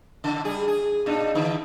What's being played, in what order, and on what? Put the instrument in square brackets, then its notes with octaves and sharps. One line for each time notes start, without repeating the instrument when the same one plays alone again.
[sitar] C#3
G3 G#4
G#4
A#2 D4 D#4
D3 E3